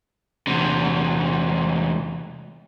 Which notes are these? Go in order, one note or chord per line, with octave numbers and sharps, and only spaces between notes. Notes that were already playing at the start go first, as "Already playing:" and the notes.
E2 C3